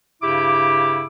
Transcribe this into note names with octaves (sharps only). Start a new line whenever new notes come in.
G2 C#3 E4 G4 D6